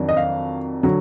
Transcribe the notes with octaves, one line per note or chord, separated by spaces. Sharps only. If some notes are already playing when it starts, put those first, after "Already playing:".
Already playing: F2 D#3 F#3 D4
D#5
F5
D3 F#3